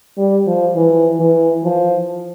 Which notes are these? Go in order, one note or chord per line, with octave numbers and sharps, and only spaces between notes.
G3
F3
E3
E3
F3